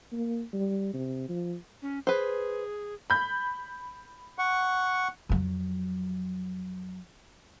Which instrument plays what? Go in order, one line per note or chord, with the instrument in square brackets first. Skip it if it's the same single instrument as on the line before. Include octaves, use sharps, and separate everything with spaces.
[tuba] A#3
G3
C3
F3
[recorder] C#4
[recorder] G#4 [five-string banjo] B4 C5
[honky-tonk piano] B5 G6
[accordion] F#5 C#6
[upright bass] F2 F#3